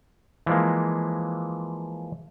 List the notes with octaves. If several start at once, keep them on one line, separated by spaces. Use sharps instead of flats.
E3 F3 G#3 A#3